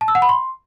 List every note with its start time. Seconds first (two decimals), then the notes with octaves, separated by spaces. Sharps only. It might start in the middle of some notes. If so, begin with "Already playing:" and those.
0.01 A5
0.08 E6
0.15 F#5
0.22 B5
0.29 C6